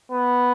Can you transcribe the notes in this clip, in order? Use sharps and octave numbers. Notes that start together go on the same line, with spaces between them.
B3